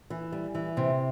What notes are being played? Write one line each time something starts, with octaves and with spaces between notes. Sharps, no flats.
E3
G3
E3
C3